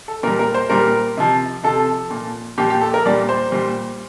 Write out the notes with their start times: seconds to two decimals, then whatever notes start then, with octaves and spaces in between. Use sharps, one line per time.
0.08 A4
0.23 A#2 A#4
0.27 G3
0.39 A#4
0.54 C5
0.70 A#2 G3 A#4
1.17 C3 F3
1.64 C3 F3 A4
2.11 A#2 F3
2.58 A#2 F3 G4
2.70 G4
2.81 A4
2.94 A#4
3.05 A#2 G3 D5
3.29 C5
3.52 A#2 G3